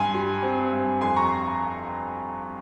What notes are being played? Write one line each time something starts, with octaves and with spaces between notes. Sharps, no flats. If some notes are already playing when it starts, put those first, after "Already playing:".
Already playing: G2 G#5 C6
G3
C4
G2
F2 G#5 C6
A#5 C#6